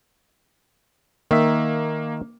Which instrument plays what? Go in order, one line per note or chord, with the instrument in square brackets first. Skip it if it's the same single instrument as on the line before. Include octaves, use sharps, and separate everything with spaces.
[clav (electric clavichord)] D#3 E5 [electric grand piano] A#3